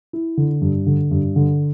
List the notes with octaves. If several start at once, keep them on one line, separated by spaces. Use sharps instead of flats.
E4
D3
G2
D3
G2
D3